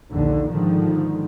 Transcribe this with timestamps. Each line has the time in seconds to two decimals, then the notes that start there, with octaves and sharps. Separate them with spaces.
0.11 A#1 D#2 D3
0.51 G#2 D3 D#3 F3